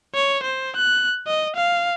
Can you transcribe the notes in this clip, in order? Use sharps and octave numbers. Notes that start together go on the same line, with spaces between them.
C#5
C5
F#6
D#5
F5